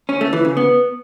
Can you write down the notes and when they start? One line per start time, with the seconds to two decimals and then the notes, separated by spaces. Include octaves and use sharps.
0.09 C#4
0.21 A3
0.33 E3
0.45 C#3
0.57 B3